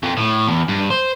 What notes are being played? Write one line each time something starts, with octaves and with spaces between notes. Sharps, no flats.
F2
A2
E2
G2
C5